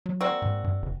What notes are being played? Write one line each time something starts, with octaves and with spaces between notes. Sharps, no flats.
F#3
A#3 C4 F#4 D5 E6
G#2
G2
F#1